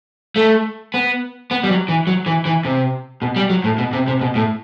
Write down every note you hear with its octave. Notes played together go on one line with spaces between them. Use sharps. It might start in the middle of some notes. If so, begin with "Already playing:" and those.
A3
B3
B3
G3
F#3
E3
F#3
E3
E3
C3
B2
G3
F#3
A2
B2
C3
C3
B2
A2